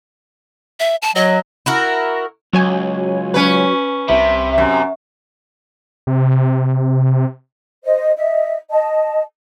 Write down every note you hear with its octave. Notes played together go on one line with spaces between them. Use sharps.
E5
A5
F#3 D#5
E4 F#4 A#4
C#2 F#3 C#5 G#5
C#4 B4
C2 C3 E5 B5
F#2
C3
C5 D#5
D#5 E5
D#5 A5